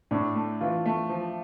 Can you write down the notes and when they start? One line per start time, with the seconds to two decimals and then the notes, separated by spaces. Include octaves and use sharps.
0.11 A2 D4
0.35 A3
0.61 E3 F4
0.86 A3
1.09 F3